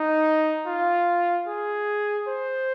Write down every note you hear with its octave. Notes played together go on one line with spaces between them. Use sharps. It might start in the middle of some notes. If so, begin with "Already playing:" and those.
Already playing: D#4
F4
G#4
C5